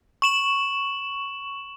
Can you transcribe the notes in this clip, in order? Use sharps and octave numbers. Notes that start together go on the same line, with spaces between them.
C#6 E7 F#7